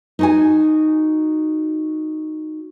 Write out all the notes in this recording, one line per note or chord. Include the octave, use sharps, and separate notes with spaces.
D#4 F#4 G#5